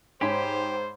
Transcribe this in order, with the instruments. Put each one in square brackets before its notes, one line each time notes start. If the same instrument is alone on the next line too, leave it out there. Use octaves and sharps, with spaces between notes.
[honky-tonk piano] G#2 [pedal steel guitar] G4 [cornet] C5 [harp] C#5 G#5 B5